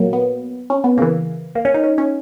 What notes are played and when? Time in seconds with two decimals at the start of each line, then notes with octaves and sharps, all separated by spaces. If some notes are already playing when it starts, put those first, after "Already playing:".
Already playing: A#2 F#3 A#3
0.13 B3
0.70 C#4
0.84 B3
0.98 C#3 E3 A#3
1.55 A#3
1.65 C#4
1.74 D#4
1.84 C#4
1.98 C#4